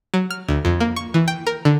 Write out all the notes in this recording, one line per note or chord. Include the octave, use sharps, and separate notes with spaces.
F#3
F6
D2
F2
A#3
C#6
E3
G5
A#4
D3